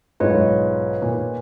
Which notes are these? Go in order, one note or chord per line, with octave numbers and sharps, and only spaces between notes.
B1 G#2 F4 B4 C#5
A#2